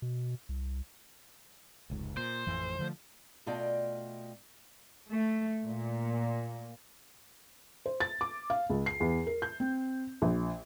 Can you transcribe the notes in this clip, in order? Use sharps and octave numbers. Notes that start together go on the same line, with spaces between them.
B2
C2
F1 C#2 G#2
A#2 C5
A1 F2 E3
D3 F3 A3
B2 A3 F4 D5 D#5 G5
A3
A#2
C5
A6
D6
F5
C#2
C7
E2
A#4
G6
C4
A#1